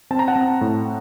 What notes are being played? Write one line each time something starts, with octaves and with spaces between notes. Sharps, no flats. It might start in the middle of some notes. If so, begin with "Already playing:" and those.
C4 A5
A#5
F#5 A5
C4
A2